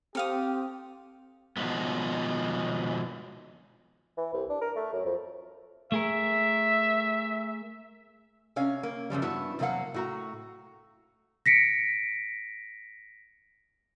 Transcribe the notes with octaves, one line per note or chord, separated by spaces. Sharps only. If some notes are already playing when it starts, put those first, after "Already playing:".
C4 G4 A4 F5 D#6
B2 D#3 F3 G#3 B3
E3
C2
D4
A#4
A3
F#2
F2
A3 G#4 A#4 E5
C3 C#4 C#5 F5
A#3
F#2 C#3 F3 G3
G2 B3 E4 F#4 A5
E2 C3 F#3 A#3 F5 F#5
A2 F#4 A#5
A#6 B6 C#7 D7